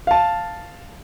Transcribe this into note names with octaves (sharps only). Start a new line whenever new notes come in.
F5 A5